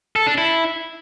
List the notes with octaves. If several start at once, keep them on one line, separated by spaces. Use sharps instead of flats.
A4
D4
E4